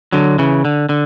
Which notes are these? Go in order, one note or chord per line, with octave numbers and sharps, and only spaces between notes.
D3 F#3
C#3 E3
D3
D3